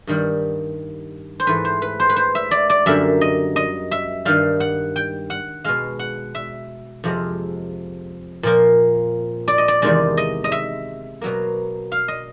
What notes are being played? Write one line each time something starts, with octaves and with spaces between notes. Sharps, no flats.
G2 D#3 G3
C5
G#2 E3 A3 B4
C5
B4
C5
B4
C5
E5
D5
D5
F#2 D3 G3 A#3 E5
D#5
D#5
E5
G2 D#3 G3 F5
F#5
G5
F#5
B2 G#3 F5
F#5
E5
F2 C3 F3 G#3
A#2 F3 A#3
D5
D#5
D5
E2 C3 D#3 G#3 D5
D#5
D#5
E5
B2 F#3 A#3
F5
D#5